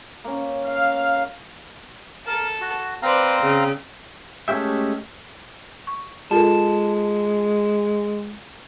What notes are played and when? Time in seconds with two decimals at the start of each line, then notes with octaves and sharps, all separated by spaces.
0.24 A#3 C#4
0.68 F5
2.27 A4 A#4 A5
2.61 F#4
3.02 C4 B4 C5 D5 F5 A#5
3.42 C#3
4.48 G#3 A3 C#4 G4 E5
5.87 C#6
6.31 G#3 F4 A4 A#4 A5